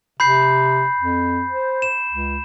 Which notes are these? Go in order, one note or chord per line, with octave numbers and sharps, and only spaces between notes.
C3 B5 G6 C7
F2
C5
E7
C#2